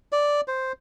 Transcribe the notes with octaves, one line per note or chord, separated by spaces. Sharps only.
D5
C5